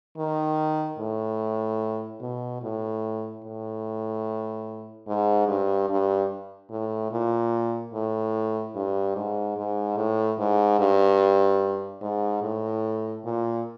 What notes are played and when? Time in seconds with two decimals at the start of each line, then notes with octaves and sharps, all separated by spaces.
0.17 D#3
0.99 A2
2.21 B2
2.62 A2
3.44 A2
5.08 G#2
5.48 G2
5.89 G2
6.70 A2
7.12 A#2
7.93 A2
8.75 G2
9.16 G#2
9.57 G#2
9.97 A2
10.39 G#2
10.80 G2
12.02 G#2
12.43 A2
13.25 A#2